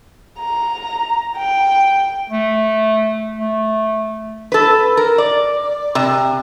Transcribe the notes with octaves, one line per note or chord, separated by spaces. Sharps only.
A#5
G5
A3
A3
A4 B4
A#4
D5
C3